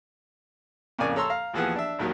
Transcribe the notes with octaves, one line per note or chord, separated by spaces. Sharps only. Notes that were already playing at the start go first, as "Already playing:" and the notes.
F2 A2 C#3 A#3 D5 G#5
A4 C#5 A#5 C6 E6
F5 A#5
D#2 E3 F3 B3 G#4 F#5
D4 E5
A#1 D#2 D#3 F#3